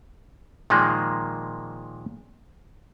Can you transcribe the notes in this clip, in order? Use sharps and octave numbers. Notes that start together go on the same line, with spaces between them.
A#2 D#3 F3 G#3 A#3